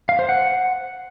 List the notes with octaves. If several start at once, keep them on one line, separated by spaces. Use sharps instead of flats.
F5
C5
F#5